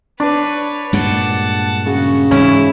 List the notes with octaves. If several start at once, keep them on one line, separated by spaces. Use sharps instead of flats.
D4 B4 C#5
G2 A#2 G#3 F#5 A5
C#3 F#4
G#2 E3 C#4 E4